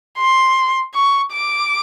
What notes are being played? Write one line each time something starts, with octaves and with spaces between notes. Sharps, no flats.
C6
C#6
D6